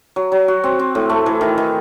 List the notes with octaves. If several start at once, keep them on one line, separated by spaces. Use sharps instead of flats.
F#3
F#3
F#4
C4
C4
A2
A3
E3
D#3
D#3